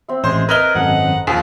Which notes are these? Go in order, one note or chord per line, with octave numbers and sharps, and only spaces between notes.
C4 E5
A1 G#3 C5 C6
A#4 B4 D#5 F6 G#6 G7
G#1 F#2 D#4 A4 F#5
D#2 F3 G#4